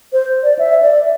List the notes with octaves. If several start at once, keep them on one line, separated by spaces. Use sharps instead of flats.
C5
D5
E5
D5